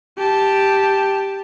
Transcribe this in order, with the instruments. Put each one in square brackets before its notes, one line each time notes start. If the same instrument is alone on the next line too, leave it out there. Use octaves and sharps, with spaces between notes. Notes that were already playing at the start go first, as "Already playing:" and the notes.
[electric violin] G4 A5